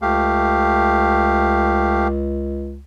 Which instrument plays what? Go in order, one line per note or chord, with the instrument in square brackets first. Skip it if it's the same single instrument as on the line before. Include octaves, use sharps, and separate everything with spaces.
[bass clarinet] C#2 [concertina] A3 G4 F5